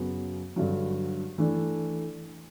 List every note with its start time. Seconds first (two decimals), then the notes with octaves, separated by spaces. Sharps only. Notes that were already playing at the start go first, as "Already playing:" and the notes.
Already playing: F#2 C#3 F#3 B3
0.56 G2 D3 F#3
1.38 E3 A3 D4